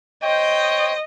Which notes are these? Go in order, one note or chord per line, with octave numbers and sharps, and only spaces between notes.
C5 C#5 D#5 G5